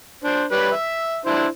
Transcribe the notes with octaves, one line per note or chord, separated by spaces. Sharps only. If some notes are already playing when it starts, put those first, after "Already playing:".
D4 C5
G3 B4 C#5
E5
D4 E4 C5